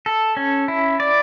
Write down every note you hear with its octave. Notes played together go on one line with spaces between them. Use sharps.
A4
C#4
E4
D5